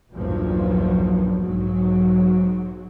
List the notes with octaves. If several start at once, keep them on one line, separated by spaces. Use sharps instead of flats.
B1 E2 G2 A#2 F3 F#3
B1 G#2 F#3